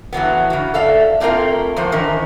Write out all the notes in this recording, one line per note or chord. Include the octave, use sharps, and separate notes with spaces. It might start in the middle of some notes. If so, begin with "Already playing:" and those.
A2 E3 F#3 B3
C#3 F#4
A4 D5 E5 F5
A3 A#3 C4 F4 A#4 F5
E2 A2 F3 C5
D#3 E3 C#4 A#4